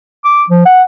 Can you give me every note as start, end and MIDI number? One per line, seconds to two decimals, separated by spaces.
0.25 0.44 86
0.50 0.60 53
0.66 0.83 78